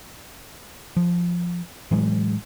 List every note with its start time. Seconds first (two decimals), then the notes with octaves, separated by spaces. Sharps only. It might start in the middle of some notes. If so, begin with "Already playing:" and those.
0.97 F3
1.91 A2 E3 F#3 G#3